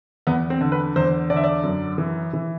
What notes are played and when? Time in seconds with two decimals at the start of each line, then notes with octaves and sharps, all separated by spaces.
0.27 E2 B3
0.50 C4
0.61 D3
0.72 B4
0.96 E2 C5
1.30 D3 D5
1.36 E5
1.44 D5
1.64 F#2
1.98 E3
2.34 E3